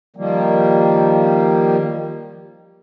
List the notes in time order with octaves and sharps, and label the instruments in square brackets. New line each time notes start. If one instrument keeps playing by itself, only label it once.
[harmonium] D#3 F3 G3 A#3